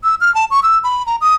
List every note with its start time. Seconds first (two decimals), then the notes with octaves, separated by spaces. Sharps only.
0.04 E6
0.21 F6
0.35 A5
0.51 C#6
0.63 E6
0.84 B5
1.06 A#5
1.21 D#6